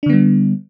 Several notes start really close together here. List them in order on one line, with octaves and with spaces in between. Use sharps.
D4 D3 B3 G3